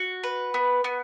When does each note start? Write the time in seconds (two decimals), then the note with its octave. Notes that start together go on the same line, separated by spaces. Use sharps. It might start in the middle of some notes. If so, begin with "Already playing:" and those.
Already playing: F#4
0.23 B4
0.54 B3
0.84 B3